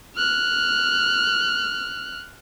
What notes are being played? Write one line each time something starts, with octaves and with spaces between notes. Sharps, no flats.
F6 F#6